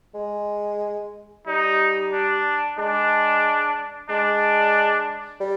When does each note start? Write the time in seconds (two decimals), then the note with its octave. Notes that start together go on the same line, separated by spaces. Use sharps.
0.15 G#3
1.47 G3 D#4
2.13 D4
2.78 G#3 D4
4.09 G#3 D4
5.41 G3